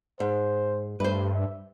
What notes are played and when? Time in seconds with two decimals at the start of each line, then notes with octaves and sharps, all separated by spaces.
0.20 G#2 C5
1.00 G2 A3 B4 C5
1.34 E5